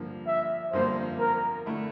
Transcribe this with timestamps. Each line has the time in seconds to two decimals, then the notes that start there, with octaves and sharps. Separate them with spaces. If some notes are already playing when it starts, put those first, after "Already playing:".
Already playing: G2 D3 F3 A#3
0.27 E5
0.73 G2 D3 F3 A#3 C5
1.19 A#4
1.66 D3 A3 E4